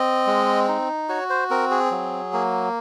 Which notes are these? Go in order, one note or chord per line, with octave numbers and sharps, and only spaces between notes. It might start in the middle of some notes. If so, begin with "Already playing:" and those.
Already playing: C4 D#5
G#3
D#4
F#4 C#5
C5
C4 A#4
G#4
F#3
A#3